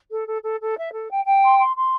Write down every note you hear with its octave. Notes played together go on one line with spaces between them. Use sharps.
A4
A4
A4
A4
E5
A4
G5
G5
C6
C6
C6